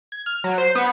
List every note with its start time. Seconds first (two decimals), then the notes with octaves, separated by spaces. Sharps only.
0.12 G#6
0.26 F6
0.44 F#3
0.58 C5
0.75 B3